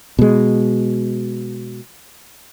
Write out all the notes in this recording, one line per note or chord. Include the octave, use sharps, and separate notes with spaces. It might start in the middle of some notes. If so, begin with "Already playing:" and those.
B2 G#3